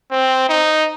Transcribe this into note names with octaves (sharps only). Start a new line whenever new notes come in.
C4
D#4